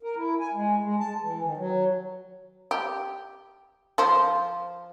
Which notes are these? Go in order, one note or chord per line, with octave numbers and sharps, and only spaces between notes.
A#4
E4
G#5
G#3
G#3
A5
E3
D#3
F#3
G4
F3 C5